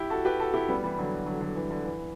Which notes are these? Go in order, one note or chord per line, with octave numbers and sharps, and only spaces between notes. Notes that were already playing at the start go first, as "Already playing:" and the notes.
Already playing: E4 G4
F#4 A4
G4 B4
F#4 A4
E4 G4
G3 B3
E3 G3
D3 F#3
D3 F#3
D3 F#3
E3
D3
E3